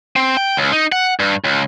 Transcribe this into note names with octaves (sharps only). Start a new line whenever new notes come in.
C4
G5
C#2
D#4
F#5
G2
C#2